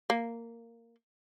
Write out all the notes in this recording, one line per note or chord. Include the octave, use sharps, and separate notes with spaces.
A#3